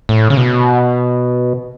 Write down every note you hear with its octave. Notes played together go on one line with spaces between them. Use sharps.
A2
C#3
B2